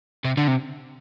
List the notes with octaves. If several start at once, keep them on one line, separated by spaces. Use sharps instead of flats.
C3
D3
C3